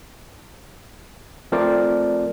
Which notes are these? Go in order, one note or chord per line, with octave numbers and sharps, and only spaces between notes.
F3 A3 C4 A#4 C5 D5